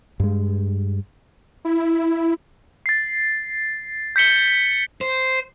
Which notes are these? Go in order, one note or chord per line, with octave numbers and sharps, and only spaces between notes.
G2 G#3
E4
A6 C7
G6 B6 C#7 G7
C5